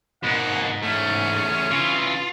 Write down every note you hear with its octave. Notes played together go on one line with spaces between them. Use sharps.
G#2 B2 A#3 F#5
E2 A3 C#4
C#3 E3 F4